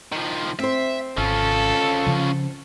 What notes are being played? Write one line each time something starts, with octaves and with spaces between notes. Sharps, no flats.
D#3 F3
C4 C5 E5
G#1 C#4 F4 A4
C#3 F3